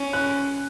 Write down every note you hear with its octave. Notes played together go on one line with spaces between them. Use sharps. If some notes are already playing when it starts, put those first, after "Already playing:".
Already playing: C#4
F#6